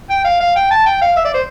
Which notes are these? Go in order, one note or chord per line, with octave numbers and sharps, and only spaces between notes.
G5
F5
F5
G5
A5
G5
F5
E5
D5
C5